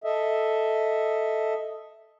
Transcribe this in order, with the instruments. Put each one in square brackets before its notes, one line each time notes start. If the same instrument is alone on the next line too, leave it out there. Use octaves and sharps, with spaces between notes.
[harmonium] A4 D#5 E5